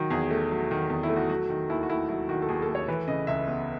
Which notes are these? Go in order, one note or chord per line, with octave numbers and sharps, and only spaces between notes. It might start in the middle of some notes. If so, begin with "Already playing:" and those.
Already playing: D#3 F#3
E2 G#4
A3
F#3
D#3
E2
E4
A3
F#4
F#3 F#4
D#3
D#2 E4
F#4
A3 E4
F#3 E4
D#3 F#4
A4
D#2 G#4
A4
A3
C#5
E3 B4
C#3 D#5
C#2 E5
B3